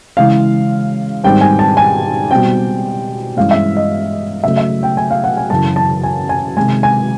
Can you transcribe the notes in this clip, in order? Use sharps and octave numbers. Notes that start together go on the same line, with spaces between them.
C#3 E3 G#3 F5
G#2 D#3 G3 C4 G5
G#5
A5
G#5
B2 G3 C4 G5
G2 E3 G#3 C#4 F5
E5
D#5
C#3 F#3 A3 E5
E5
G5
G#5
F5
F#5
G#5
F#2 C#3 E3 A5
A5
G#5
G#5
C3 D#3 G#3 G#5
G#5